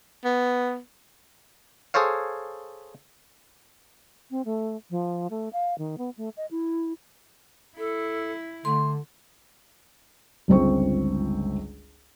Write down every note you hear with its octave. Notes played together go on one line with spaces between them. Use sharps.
B3
G#4 A4 C5 C#5 F5
C4
A3
F3
A3
F5
D#3
B3
A3
D#5
E4
E4 A4
D3 A3 C6
G1 C#2 C4 C#6